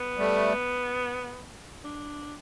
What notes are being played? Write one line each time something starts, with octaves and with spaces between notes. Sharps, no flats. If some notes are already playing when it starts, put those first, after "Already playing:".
Already playing: B3
G3 A3
D4